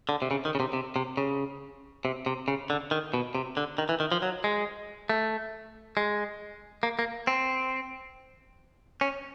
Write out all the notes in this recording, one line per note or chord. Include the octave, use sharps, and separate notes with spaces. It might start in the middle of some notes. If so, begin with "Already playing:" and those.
D3
C3
C#3
D#3
C#3
C3
C3
C3
C#3
C3
C3
C#3
D3
D#3
B2
C3
D3
D#3
E3
D#3
F3
F#3
G#3
A3
G#3
A#3
A#3
C4
C#4